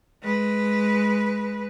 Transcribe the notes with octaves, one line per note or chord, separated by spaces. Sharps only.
G#3 B4